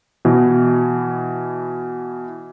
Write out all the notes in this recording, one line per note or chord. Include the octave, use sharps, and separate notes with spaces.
B2 E3